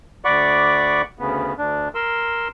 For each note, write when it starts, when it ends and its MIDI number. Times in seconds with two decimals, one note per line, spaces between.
0.25 1.02 38
0.25 1.02 74
0.25 1.02 78
0.25 1.02 83
0.25 1.02 85
0.25 1.02 86
1.19 1.54 38
1.19 1.54 49
1.19 1.54 59
1.58 1.88 38
1.58 1.88 62
1.95 2.48 70
1.95 2.48 84
1.95 2.48 88